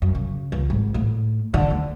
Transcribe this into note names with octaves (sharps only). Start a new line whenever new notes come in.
F#2
C#3
C#2
G#1
A2
D3
D2